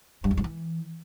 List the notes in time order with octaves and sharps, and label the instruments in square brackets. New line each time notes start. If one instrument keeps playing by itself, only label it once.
[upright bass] G2
E2
G2
E3